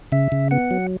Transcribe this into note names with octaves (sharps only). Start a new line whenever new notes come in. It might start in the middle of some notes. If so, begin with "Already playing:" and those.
C#3 E5
C#3
B3 F#5
F#3